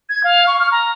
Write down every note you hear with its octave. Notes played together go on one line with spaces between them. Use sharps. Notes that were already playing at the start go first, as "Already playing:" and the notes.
G#6
F5
C#6
F6
A#5